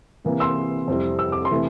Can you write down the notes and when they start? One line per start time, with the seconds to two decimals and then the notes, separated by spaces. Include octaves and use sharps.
0.25 C3 E3 A#3
0.40 C6 E6
0.88 F2 C3 G3 C4 E4
1.19 E6
1.32 D6
1.45 C6
1.51 C3 E3 A3 E4